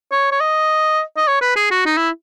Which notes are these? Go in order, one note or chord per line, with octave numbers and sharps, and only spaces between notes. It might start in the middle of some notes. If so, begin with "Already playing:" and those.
C#5
C#5
D#5
D#5
C#5
B4
G#4
F#4
D#4
E4